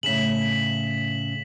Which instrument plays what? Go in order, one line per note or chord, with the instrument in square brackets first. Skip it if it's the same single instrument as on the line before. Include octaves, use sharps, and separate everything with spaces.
[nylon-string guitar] A2 C#3 [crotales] B6 E7 F#7